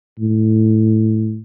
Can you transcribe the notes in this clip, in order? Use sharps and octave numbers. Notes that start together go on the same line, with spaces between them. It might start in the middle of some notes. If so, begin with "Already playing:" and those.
A2